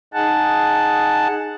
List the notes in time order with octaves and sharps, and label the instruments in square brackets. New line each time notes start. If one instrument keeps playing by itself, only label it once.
[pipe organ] D#4 G#4 F#5 A5